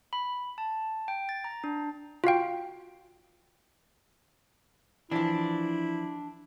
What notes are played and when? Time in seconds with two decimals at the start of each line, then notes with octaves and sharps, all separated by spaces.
0.13 B5
0.58 A5
1.08 G5
1.29 A6
1.44 A#5
1.64 D4
2.24 F4 F#4 F5 G5
5.11 E3 F3 D4 E4